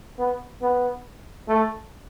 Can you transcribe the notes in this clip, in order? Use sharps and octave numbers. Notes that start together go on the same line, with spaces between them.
B3
B3
A3